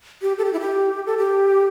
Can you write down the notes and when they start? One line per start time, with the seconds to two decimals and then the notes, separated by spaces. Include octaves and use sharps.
0.22 G4
0.38 A4
0.45 G4
0.53 E4
0.60 G4
1.06 A4
1.18 G4